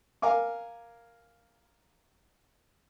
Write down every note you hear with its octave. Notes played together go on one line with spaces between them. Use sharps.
A#4 F5 G#5 D6